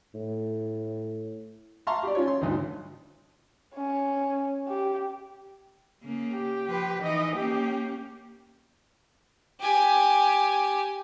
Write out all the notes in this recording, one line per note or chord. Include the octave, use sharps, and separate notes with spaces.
A2
E5 F5 A5 A#5 C6 C#6
G4 D5
C#4 F4 C#5
C6
G#1 D2 G2
C#4
G4
C#3 A#3
G4
F3 B4
E3 D#4 D#5
A#3 C#4 G4
G4 G#5